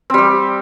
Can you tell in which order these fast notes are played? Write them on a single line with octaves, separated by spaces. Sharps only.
C4 G3 G4